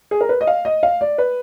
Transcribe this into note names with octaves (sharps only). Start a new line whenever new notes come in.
G#4
A#4
B4
D#5
F5
D#5
F5
D5
B4